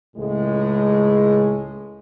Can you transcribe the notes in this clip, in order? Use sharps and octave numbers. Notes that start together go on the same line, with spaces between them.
C#2 A2 G#3